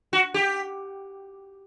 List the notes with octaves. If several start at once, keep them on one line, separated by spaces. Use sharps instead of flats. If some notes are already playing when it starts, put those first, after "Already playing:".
F#4
G4